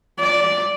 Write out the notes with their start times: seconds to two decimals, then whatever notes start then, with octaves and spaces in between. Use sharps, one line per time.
0.20 D5